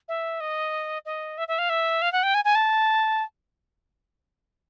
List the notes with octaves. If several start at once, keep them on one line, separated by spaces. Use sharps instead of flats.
E5
D#5
D#5
E5
E5
F5
E5
F5
F#5
G5
G#5
G#5
A5